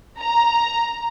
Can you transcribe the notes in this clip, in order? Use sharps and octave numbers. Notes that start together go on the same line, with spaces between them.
A#5